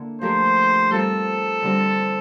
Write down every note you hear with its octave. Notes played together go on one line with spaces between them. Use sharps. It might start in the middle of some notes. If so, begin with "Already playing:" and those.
Already playing: D3 A#3 E4
F3 A3 D4 G4 A#4 C5
G3 C4 F4 A4 A#4
D3 G3 C4